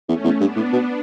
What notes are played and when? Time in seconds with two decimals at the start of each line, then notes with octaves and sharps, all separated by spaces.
0.08 E2 A3 C#4
0.24 E2
0.40 G2 B3 D4
0.56 A2
0.73 B2